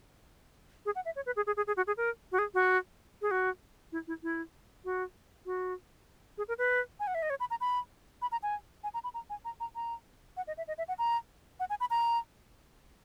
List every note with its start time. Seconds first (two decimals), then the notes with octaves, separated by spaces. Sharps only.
0.86 G#4
0.95 F#5
1.05 E5
1.16 C#5
1.26 B4
1.36 G#4
1.47 G#4
1.57 G#4
1.67 G#4
1.77 F#4
1.87 G#4
1.97 A#4
2.32 F#4
2.39 G#4
2.54 F#4
3.22 G#4
3.31 F#4
3.92 E4
4.08 E4
4.23 E4
4.85 F#4
5.46 F#4
6.38 G#4
6.48 A#4
6.58 B4
7.00 G#5
7.07 F#5
7.15 E5
7.23 D#5
7.30 C#5
7.40 B5
7.50 A#5
7.61 B5
8.22 B5
8.32 A#5
8.43 G#5
8.84 G#5
8.94 A#5
9.04 B5
9.14 A#5
9.30 G#5
9.45 A#5
9.60 A#5
9.75 A#5
10.37 F#5
10.47 D#5
10.57 E5
10.68 D#5
10.78 E5
10.88 F#5
10.98 A#5
11.60 F#5
11.70 G#5
11.80 B5
11.90 A#5